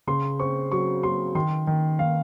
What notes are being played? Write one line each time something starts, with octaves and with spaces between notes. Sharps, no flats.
C#3 C6
C4 C#6
F#3 C#6
F#3 C6
D#3 C6
D#3
D#3 F5